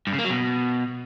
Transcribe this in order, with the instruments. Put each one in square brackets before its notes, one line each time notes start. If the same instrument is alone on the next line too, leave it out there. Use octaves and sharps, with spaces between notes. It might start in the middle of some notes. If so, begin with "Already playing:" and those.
[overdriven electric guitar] G2
C#3
A#3
F#3
B2